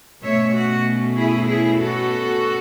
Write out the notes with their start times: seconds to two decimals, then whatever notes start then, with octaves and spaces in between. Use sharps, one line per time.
0.23 B2 A3 C#4 C#5 E5
0.54 F#4
1.16 E4 G#4
1.47 E4 G#4
1.78 F#4 A4